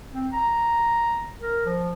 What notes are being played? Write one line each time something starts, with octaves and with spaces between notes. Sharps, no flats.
C4
A#5
A#4
F3